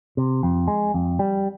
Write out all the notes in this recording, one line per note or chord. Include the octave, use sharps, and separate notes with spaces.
C3
F2
G#3
F2
G3